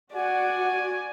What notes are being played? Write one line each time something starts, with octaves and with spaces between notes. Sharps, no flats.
F#4 D5 F#5 G#5